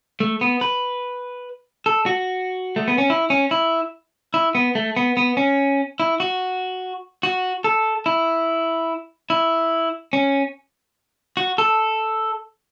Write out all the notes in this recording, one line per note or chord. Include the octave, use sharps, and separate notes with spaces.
A3
B3
B4
A4
F#4
A3
B3
C#4
E4
C#4
E4
E4
B3
A3
B3
B3
C#4
E4
F#4
F#4
A4
E4
E4
C#4
F#4
A4